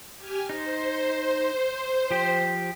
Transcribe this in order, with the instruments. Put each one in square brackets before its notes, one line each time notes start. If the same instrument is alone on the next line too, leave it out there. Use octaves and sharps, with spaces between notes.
[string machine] G4 G#5 F6
[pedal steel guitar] D#4 [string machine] C5
[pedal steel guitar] F3 G4